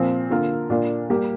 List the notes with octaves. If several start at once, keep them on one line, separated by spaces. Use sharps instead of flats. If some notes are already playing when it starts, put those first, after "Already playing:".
Already playing: A#2 F3 C4
D3 A#3 F4 A#4
A#2 A#3 D4 F4
G3 A#3 G4